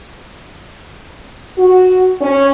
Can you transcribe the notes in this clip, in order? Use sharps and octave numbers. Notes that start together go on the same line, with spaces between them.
F#4
C#4